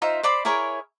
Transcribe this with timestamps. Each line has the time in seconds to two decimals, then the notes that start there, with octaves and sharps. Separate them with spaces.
0.02 D#4 F4 C5 E5
0.23 C5 D5 B5 C6
0.45 E4 G#4 A#4 C#5